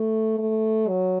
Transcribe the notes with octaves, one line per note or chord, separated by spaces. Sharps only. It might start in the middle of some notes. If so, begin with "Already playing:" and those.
Already playing: A3
A3
F#3